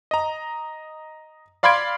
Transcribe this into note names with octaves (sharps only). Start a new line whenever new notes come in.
D#5 A#5
D5 F5 B5 C6 G#6 D7